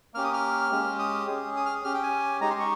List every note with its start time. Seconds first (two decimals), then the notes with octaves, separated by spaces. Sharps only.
0.14 A#3 C#4 G4 F6
0.24 D#6
0.34 F6
0.71 G#3 C#4 G4
0.99 D#6
1.27 C#4 G#4
1.57 D#6
1.66 F6
1.75 D#6
1.84 C#4 G4 F6
1.94 G5
2.03 G#5
2.41 G#3 D#4 G4 A#5
2.50 C6
2.60 C#6